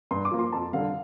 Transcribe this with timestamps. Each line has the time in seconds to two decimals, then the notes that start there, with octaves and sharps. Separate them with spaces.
0.11 G2 C6
0.25 D6
0.32 F3 A#3
0.39 C6
0.53 F2 A5
0.73 D3 G3 F5